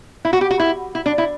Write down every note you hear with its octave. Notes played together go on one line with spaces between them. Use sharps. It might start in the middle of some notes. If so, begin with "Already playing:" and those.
E4
F#4
G4
F#4
E4
E4
D4
E4